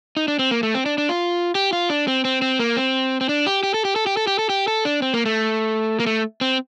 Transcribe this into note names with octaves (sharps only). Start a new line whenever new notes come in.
D#4
D4
C4
A#3
A3
C4
D4
D4
F4
G4
F4
D4
C4
C4
C4
A#3
C4
C4
D4
G4
G4
A4
G4
A4
G4
A4
G4
A4
G4
A4
D4
C4
A#3
A3
A#3
A3
C4